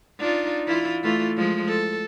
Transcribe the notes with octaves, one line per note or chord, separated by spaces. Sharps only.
D4 D#4 F4
E3 E4 F4
E3 A3 F4
F3 G#3
A4